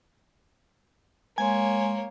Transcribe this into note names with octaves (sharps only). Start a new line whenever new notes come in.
G#3 A#3 C#5 G#5 C6